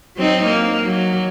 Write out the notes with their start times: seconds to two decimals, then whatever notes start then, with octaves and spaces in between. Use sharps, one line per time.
0.17 F#3 C4 D#4
0.46 A#3
0.85 F#3